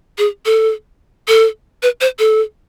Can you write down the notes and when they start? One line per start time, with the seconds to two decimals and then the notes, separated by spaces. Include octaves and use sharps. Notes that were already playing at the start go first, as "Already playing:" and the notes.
0.18 G#4
0.46 A4
1.28 A4
1.83 B4
2.01 C5
2.19 A4